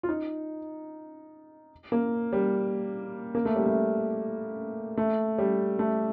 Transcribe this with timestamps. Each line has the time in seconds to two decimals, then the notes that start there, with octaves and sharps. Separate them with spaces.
0.03 F4
0.09 D#4
1.92 A#3
2.33 G3
3.35 A#3
3.45 A3
3.56 G3
3.66 A3
4.97 A3
5.38 G3
5.79 A3